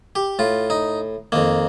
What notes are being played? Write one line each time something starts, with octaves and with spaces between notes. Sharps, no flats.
G4
A2 F4
D#4
F2 D#3 A#3